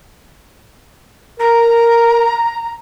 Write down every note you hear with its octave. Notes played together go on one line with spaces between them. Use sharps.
A#4 A#5